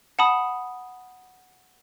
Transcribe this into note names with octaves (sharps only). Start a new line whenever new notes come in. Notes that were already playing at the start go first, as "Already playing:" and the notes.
F#5 A5 B5 D#6